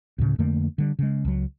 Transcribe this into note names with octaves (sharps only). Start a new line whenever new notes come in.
D2 A2 C#3
F2 D3 A3 A#3
D3 G3
C#3 G#3
C#2 F#3